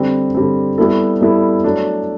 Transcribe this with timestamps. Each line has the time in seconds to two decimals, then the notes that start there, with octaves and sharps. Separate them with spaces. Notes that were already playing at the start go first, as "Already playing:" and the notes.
Already playing: D3 G3 C4
0.35 D3 G3 C4
0.78 G3 B3 E4 A4
1.21 G3 B3 E4 A4
1.64 F#3 A3 D4